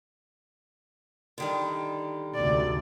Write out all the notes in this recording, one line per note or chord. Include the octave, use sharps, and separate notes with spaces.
D3 D#3 G3
D2 G#2 C3 D5